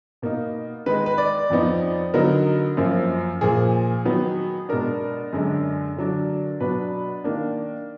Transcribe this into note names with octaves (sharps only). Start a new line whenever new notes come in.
B2 A#3 D#4
D#3 G#3 D#4 B4
B4
D5
F2 F3 B3 D#4
D3 F#3 B3 D#4 A#4
F#2 F3 A#3
A#2 F3 A#3 G#4
D#3 F#3 B3 D#4
B2 G#3 D4 A#4
F#2 D3 G#3 D4
D3 F#3 D4
B2 F#3 D4 B4
D#3 A#3 D4